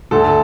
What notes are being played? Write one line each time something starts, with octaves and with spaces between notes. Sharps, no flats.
D2 A4